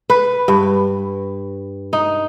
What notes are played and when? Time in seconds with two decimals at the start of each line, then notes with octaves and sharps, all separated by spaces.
0.10 B4
0.48 G2
1.93 D#4